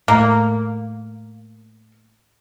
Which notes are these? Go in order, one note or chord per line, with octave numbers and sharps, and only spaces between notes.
A2 A#3